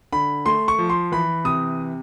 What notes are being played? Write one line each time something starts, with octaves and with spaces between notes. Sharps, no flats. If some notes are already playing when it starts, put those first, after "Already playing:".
D3 B5
A3 C6
C#6
F3
C6
E3 B5
C3 D#6